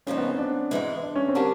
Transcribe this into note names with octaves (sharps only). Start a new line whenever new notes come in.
C#3 F3 A#3 C#4 D#4
B3
C4
D4
G#2 E3 G#3
D4
C#4
C4
D3 G3 A#3 D4